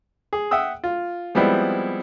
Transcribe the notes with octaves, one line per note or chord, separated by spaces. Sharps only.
G#4
E5 F#5 G5 D#6 E6
F4
F3 G3 G#3 B3 C4 E4